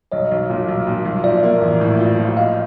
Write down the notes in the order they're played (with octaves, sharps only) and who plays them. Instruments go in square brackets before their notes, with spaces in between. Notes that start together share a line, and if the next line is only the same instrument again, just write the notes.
[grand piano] B1 [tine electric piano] C#5 D#5
[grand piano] B1
A#2
B1
A#2
B1
[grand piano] F3 [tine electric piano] D5 E5
[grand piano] A#3
A1
A2
F3
F3
[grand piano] F3 [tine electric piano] D#5 F5